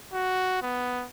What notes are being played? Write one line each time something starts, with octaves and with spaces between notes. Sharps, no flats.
F#4
B3